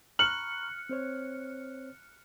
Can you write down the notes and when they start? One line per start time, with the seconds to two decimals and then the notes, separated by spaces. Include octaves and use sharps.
0.19 A#5 B5 C#6 F6 F#6 C#7 F#7
0.89 C4 C5 C#5